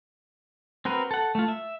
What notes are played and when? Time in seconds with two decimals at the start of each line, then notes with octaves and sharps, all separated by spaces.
0.85 C4 F#4 A#4 B4
1.11 A4 F#5
1.35 A3 F4
1.48 E5